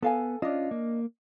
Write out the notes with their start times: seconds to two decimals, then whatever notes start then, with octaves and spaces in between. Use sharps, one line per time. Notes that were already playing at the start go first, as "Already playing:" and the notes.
0.03 B3 A4 F5 G#5
0.42 C#4 D4 F4 D#5
0.71 A#3